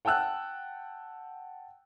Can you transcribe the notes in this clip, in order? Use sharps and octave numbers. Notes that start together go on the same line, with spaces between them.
F#5 G5 A5 E6 F#6